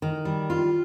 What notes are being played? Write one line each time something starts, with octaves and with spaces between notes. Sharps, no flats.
D#3
G3
F4